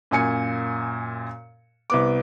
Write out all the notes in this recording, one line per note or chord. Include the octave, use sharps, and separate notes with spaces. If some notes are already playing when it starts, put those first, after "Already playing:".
F#2 A#2 G#5 C#7
C2 B3 D6